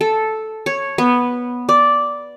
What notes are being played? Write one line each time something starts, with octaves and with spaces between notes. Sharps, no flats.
A4
C#5
B3
D5